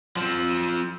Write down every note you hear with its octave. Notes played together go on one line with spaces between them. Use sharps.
F3 C4